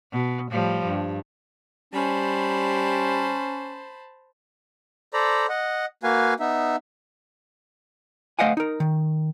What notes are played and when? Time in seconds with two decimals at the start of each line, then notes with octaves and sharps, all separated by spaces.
0.12 B2
0.51 A2 F3 G3
0.86 G2
1.94 G3 C#4 C5 A5 B5
5.14 A4 C5 D5 A#5 B5
5.49 D#5 F#5
6.03 A#3 F#4 B4 F5 G#5
6.40 B3 D#4 E5
8.39 A3 C5 D#5 F5 F#5 G#5
8.57 D#4 A#4
8.80 D#3